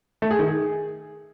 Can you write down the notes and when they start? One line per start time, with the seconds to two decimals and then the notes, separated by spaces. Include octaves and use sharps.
0.22 A3
0.31 G#4
0.39 D#3
0.48 G#4